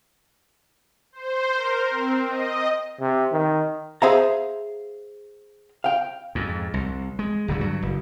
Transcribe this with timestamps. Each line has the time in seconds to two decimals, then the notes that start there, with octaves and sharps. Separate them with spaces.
1.12 C5
1.56 A#4
1.91 C4
2.26 D#5
3.00 C3
3.32 D#3
4.02 G#4 C5 E5 F5 A#5
5.84 F5 G5
6.35 F2 G#2
6.74 C2
7.19 G#3
7.48 D1 D3 F#3
7.61 G2 F#3
7.82 F#1